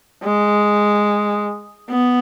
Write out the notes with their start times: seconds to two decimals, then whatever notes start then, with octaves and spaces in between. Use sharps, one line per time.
0.23 G#3
1.90 B3